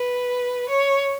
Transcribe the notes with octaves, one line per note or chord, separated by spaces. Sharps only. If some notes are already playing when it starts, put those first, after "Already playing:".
Already playing: B4
C#5